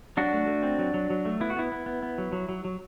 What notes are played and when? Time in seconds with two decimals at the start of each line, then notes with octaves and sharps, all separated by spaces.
0.17 F#3 D4 F#4
0.33 A3
0.47 A3
0.63 C4
0.79 F#3
0.94 F#3
1.10 F#3
1.25 A3
1.40 B3 E4
1.50 F#4
1.57 B3 E4
1.72 B3
1.86 B3
2.03 B3
2.18 F#3
2.32 F#3
2.49 F#3
2.65 F#3